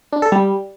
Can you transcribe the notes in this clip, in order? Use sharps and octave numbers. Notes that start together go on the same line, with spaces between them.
D4
A4
G3